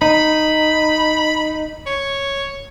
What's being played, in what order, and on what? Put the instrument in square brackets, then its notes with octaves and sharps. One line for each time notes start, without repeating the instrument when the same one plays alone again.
[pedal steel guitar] D#4 [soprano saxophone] B5
[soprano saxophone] C#5